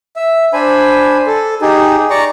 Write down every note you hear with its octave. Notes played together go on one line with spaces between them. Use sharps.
E5
D4 C5 G#5 B5
A4
D#4 G4 G#4
D5 A#5 C#6